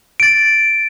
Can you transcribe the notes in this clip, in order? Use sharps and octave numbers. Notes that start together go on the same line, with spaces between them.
A6 D7